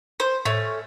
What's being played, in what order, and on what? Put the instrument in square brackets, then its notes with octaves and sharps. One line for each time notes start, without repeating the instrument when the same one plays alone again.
[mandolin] C5
[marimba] A2 [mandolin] A3 C#4